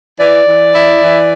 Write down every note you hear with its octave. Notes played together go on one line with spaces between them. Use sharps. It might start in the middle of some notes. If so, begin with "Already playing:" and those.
E3 D5
E3
E4
E3